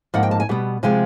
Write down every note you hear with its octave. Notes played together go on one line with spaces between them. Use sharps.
G#2 F3 A#3 F#5
G5
A5
G#5
B2 G3 B3
C3 F3 G#3 G#5